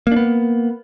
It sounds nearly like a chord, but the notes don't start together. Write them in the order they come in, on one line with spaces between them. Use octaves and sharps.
A#3 D4 B3